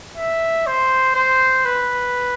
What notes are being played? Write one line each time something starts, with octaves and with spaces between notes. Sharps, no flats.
E5
C5
C5
B4